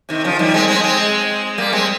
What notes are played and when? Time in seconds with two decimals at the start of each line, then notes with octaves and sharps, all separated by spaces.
0.09 C3 D#3
0.24 C#3 F3
0.39 D#3 G3
0.54 G#3 C4
0.68 G#3 C4
0.84 G#3 C4
1.58 G3 A#3
1.73 G#3 C4